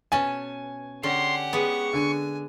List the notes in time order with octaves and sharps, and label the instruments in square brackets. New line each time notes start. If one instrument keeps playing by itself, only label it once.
[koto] B2 C#4 A5 [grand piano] G#5
[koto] D3 C#4 [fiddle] G4 F#5 [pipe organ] C6
[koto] G#3 B3 [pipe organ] C#6
[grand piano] D3 [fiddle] G#5